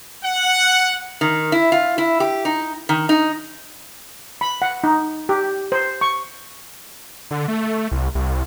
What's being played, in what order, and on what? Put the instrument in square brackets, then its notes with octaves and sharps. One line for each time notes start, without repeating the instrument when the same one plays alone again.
[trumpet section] F#5
[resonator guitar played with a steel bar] D#3
E4
F4
E4
G4
D#4
D#3
D#4
[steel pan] B5
F#5
D#4
G4
C5
C#6
[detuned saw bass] D3
A3
A3
C2
C2